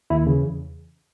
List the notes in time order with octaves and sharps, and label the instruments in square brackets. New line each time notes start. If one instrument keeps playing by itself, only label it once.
[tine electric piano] D#2 E4
C#3 E3
E2